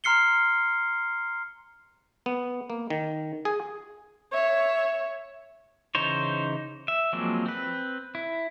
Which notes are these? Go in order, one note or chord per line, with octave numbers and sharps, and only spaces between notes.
A#5 C6 F6 C7 C#7 G7
B3
A#3
D#3
G#4
C#5 E5
C#3 E3 D#4 C5 C#5
E5
F3 F#3 G#3 A#3 C4
C4 B4
E4